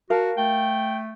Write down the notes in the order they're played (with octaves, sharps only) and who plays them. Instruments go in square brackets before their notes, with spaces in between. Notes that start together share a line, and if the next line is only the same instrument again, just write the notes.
[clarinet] F#4 [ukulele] A#4 F5 A5
[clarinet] A3 [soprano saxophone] G5